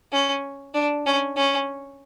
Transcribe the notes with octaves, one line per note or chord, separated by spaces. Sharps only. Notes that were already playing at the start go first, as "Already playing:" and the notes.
C#4
D4
C#4
C#4